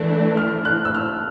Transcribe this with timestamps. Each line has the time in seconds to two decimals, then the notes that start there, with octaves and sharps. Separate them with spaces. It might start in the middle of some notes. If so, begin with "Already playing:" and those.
Already playing: E3 A3 D4
0.37 F6
0.65 F#6
0.85 E6
0.94 F6